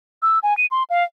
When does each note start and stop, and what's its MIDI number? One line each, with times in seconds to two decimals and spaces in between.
0.22 0.39 88
0.43 0.56 80
0.57 0.66 99
0.71 0.83 84
0.90 1.04 77